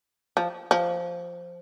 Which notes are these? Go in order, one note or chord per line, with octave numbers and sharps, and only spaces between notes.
F3
F3